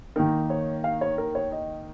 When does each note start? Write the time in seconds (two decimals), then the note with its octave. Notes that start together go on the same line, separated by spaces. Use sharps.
0.16 D#3 A#3 D#4 A#4
0.50 C#5
0.84 F5
1.01 C#5
1.18 A#4
1.35 C#5
1.52 D#5